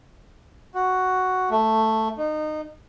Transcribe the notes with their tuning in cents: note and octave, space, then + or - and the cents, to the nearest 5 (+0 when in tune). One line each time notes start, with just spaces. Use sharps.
F#4 +5
A3 +5
D#4 -25